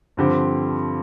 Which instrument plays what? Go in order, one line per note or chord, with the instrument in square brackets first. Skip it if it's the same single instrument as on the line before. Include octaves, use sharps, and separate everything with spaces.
[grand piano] G2 D3 F3 C4 G4